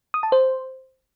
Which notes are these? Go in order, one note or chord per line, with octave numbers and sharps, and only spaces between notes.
D#6
A5
C5